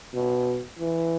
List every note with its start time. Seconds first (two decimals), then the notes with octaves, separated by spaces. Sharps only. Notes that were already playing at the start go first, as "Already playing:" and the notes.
0.14 B2
0.79 E3